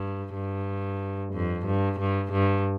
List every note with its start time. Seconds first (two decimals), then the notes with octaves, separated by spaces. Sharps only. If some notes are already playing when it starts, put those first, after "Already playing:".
Already playing: G2
0.35 G2
1.34 F2
1.66 G2
2.00 G2
2.32 G2